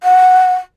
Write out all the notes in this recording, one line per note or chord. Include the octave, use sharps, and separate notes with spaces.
F#5